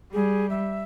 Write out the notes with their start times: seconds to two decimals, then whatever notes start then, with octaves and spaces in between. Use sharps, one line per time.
0.13 G3 G#4
0.50 E5